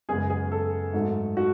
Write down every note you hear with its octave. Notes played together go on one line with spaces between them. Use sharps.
F#2 C#3 G#3 B3 G#4
G#4
A4
G#2 F#3 A3
F#4